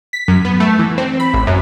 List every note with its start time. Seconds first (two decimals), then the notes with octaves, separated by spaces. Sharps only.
0.13 B6
0.28 F#2
0.45 B3
0.60 A3
0.79 E3
0.98 C4
1.20 B5
1.33 A1
1.47 F#2